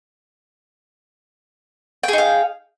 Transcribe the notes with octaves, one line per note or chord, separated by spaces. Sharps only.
D#4 G#4 F5 G5